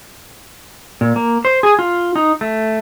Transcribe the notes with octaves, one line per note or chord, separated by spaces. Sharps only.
A#2
A#3
C5
G#4
F4
D#4
A3